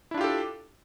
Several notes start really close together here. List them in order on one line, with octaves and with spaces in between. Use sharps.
E4 D4 F4 G4 A4